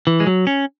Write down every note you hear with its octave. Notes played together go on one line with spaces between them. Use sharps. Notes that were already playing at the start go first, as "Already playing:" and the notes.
E3
G#3
F#3
C#4